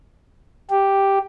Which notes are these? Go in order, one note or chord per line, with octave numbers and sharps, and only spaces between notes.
G4